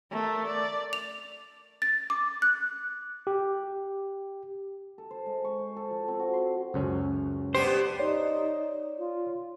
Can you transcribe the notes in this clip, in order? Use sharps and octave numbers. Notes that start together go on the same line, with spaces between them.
A3 A#4
D5
F7
A6
D6
F#6
G4
A4
C5
G#3
C#6
C5
A4
F3
C4
F#4
C6
C#2 F#2 C#4
G2 B3 G4 C5
D#4 C#5 D5
F4